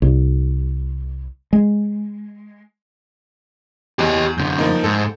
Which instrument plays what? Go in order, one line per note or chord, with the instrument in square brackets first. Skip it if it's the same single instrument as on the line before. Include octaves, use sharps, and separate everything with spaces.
[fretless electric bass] C2
G#3
[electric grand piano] E2 [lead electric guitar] G4 D#5
[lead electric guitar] F#2 D3 [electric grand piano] G6
[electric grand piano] F3 A#3 D#4
[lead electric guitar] G#2 [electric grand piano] A4